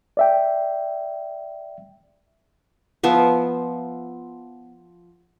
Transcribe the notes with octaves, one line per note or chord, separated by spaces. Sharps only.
D5 E5 G5
F3 B3 E5